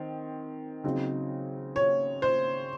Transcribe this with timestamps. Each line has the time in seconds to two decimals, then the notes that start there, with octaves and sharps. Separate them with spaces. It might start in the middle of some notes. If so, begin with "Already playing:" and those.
Already playing: D#3 C4
0.84 C#3 F#3 C4 D#4
1.76 C#5
2.22 C5